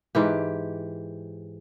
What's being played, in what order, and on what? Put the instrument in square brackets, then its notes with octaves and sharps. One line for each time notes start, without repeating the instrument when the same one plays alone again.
[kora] G#2 E3 G4